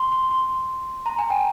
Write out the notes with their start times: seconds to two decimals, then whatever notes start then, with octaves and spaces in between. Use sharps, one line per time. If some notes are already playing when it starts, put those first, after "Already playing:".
Already playing: C6
0.12 C6
0.31 C6
1.06 A#5
1.19 G#5
1.30 G5